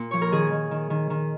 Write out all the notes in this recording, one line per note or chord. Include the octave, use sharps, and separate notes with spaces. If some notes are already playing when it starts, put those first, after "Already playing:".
Already playing: A#2
F3 C#5
A#4
D#3 G#4
D#3
D#3
D#3
D#3